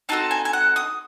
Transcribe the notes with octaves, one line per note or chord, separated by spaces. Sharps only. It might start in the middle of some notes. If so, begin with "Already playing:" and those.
C4 D#4 F#4 A4 A5
G#5
G#5
F#5
D#6